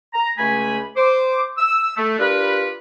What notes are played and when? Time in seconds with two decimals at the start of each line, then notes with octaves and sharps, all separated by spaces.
0.14 A#5
0.38 C#2 A3 G#5 B5
0.97 C5 D6
1.58 E6
1.97 A3
2.19 D4 F4 G4 A#4 B4